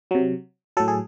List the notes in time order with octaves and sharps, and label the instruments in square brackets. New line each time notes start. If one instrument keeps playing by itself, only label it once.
[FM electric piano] C3 F#3
A2 F#3 A4
G#4